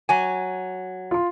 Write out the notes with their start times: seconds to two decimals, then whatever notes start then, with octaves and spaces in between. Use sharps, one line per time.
0.09 F#3 G#5
1.11 F4 C6